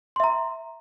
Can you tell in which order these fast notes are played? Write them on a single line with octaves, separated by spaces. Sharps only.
C6 E5 A#5